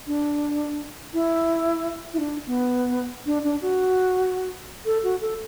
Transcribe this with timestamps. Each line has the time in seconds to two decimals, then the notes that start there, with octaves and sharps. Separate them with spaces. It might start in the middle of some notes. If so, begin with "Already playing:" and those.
0.07 D4
1.14 E4
2.14 E4
2.20 D4
2.47 B3
3.26 D4
3.44 D4
3.62 F#4
4.86 A4
5.04 F#4
5.21 A4